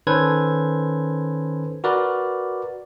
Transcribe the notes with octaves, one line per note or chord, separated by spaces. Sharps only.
D#3 C#4 A4 B4 C5 G#6
F#4 A#4 B4 D5